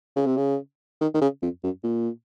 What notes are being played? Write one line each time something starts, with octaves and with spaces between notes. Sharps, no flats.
C#3
C3
C#3
D#3
D#3
C#3
F2
F#2
A#2